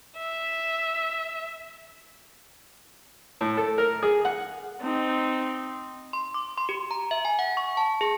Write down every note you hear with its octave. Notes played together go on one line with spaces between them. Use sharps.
E5
A2
A4
A#4
G#4
F#5
C4 D#4
C6
D6
C6
G4
A#5
E5
G#5
F#5
C#6
A5
G#4